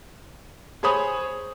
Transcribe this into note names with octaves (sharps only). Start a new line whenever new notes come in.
G#4 C5 C#5 B5 D#6